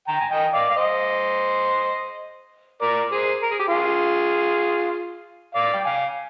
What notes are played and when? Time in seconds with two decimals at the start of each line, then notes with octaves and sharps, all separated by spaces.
0.08 G5 A#5
0.21 G#5
0.31 D#5 G5
0.54 D5 F5
0.70 F5
0.76 C5 D#5
2.81 A#4 D5
3.12 G#4 C5
3.43 A#4
3.51 G#4
3.59 G4
3.68 F4 G#4
5.55 D5 F5
5.74 G5
5.85 F5 G#5